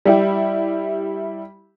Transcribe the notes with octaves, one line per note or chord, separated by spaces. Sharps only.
G3 E4 G4